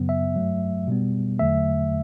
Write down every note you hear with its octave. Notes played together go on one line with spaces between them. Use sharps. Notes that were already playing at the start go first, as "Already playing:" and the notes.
Already playing: F#2 C#3 F#3 B3
E5
G2 F#3 A3
B2 G3 B3
E2 D3 F#3 A3 E5